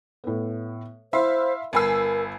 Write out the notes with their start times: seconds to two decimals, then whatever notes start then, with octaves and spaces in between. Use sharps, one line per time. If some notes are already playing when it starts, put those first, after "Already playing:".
0.24 A2 B3
1.13 E4 C5 E5 F5 B5 C6
1.73 G1 A#4 G#5 A5 B5 E6 C7